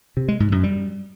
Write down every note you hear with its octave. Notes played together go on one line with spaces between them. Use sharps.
C3
G#3
G#2
F#2
G3